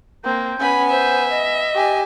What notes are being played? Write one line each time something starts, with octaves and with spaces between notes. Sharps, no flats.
A#3 C4 G6
B3 C#4 G#5 B5
C5 E5
D#5
G4 G#5